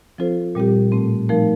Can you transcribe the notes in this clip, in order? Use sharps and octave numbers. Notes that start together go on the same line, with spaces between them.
F3 C4 F4 A4 C5
A#2 G3 C4 G4
A2 A3 C4
F3 A3 D#4 A#4